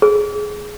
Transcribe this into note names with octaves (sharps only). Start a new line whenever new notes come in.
G#4